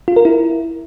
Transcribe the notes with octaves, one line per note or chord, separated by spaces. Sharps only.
F4
A#4
E4